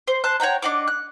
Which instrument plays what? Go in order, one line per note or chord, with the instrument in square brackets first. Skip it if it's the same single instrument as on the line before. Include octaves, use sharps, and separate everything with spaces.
[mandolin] C5
C5 A5 F#6
C#5 F#5 G5 A#5
D4 D#5 F#5 D6
F#6